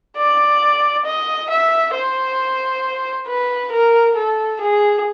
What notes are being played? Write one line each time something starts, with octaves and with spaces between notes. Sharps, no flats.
D5
D#5
E5
C5
B4
A#4
A4
G#4